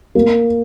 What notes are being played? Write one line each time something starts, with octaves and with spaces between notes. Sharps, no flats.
A#3